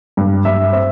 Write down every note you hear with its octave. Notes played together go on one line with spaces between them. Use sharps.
G2
G2 E5
C4 E5